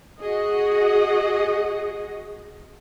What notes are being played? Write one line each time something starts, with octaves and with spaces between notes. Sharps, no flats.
F#4 G#4 D#5